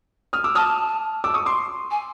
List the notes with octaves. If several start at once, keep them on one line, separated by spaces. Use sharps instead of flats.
D#6 F6
D6 E6
A5 D#6 F6
D6 E6
C#6 D#6
C6 D6
G#5